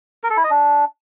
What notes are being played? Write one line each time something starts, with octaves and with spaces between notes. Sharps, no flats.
A#4
A4
E4
D#5
D4